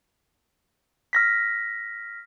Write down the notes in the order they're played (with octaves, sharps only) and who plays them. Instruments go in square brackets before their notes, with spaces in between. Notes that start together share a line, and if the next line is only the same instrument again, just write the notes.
[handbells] F6 A#6 B6